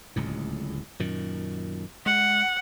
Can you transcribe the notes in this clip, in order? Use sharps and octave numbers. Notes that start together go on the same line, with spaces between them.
D1 C#2 A2
F#2 A#2 D#3
G#3 F#5